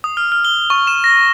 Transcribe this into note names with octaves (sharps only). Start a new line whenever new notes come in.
D#6
F6
F6
G7
C#6
E7
A#6